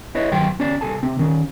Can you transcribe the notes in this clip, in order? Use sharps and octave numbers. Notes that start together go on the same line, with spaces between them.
E4 B4 C#5 D#5
G2 D#3 F#3 G5 C6
D2 C#4 D5
C2 A4 G#5 A5
C3 C4
D#3 C#4